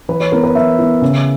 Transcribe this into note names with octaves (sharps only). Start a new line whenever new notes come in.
E3 B4
C#5
B3 E4 A#4
B4
E3 E5
B3 E4
C#3